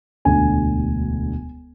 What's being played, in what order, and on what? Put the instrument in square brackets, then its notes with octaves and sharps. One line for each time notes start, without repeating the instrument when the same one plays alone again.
[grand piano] E1 D2 D3 G#5